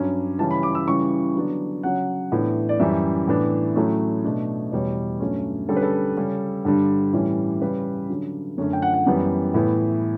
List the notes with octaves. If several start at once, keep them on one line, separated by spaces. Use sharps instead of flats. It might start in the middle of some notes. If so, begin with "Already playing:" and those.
Already playing: G2 F#3 C#4
C#3 E3 G3 C#4 A5
B5
D6
E6
C#3 E3 G3 C#6
D3 F#3 B3 D4
C#3 F#3 C#4 F#5
A2 E3 B3 D4
D5
F#2 E3 G3 C#4 E5
A2 E3 B3 D4
A2 F#3 A3 C#4
B2 A3 D4
E2 B2 G3 B3 C#5
G2 F#3 A3 C#4
D3 G3 C#4 A4
B4
A4
C#3 G3 C#4
G2 D3 G3
A2 E3 G3 C#4
C#3 G3 C#4 B4
D3 F#3 C#4
F#2 D3 A3 C#4 C#5
G5
F#5
F#5
F#2 E3 G3 B3
A2 E3 B3